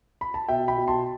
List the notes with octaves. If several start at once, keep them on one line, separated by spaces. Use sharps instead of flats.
B5
A5
B2 E5 G5
G5 B5
B2
A5 C6